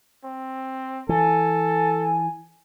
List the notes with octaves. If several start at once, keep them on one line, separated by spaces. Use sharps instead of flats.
C4
E3 A4 G#5